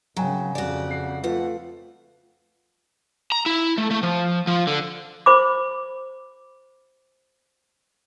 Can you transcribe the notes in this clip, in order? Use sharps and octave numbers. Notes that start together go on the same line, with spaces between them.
G#1 C#3 F#3 G5 G#5 A#5
F2 C#3 F#4 D5
C7
F2 A3 F4 B4 F#5
A#5
E4
A3
A3
F3
F3
D3
C5 B5 D6